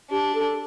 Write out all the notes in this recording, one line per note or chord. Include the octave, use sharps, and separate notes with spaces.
D4 G4
A4